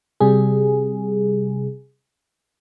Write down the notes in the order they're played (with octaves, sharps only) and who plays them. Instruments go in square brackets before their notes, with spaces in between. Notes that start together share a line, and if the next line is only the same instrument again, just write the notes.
[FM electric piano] C3 G3 G#4